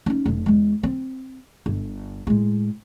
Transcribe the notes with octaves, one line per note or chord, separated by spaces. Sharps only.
C#4 D#4
F1 C3
E2 G#3
C4
G1
A2 G#3